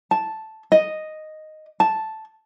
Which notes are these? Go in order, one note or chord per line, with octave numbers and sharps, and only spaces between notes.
A5
D#5
A5